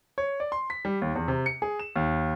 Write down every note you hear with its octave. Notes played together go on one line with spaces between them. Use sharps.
C#5
D5
C6
B6
G3
D#2
E2
C3
C#7
G#4
E7
D#2